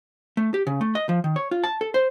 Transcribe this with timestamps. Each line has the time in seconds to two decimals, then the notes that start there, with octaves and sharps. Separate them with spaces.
0.37 A3
0.54 G4
0.67 C#3
0.81 A3
0.95 D#5
1.09 F3
1.24 D#3
1.36 C#5
1.51 F4
1.64 A5
1.81 A4
1.94 C5